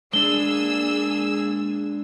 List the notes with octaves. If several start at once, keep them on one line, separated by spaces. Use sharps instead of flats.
G#3 A#3 D4 G#4 E6 G7